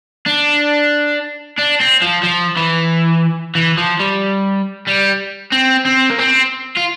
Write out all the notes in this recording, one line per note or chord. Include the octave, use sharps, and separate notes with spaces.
D4
D4
C4
F3
F3
E3
E3
F3
G3
G3
C4
C4
A#3
C4
F4